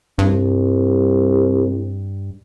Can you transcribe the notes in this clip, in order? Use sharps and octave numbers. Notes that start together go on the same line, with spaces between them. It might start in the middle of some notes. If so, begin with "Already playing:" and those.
C2 G2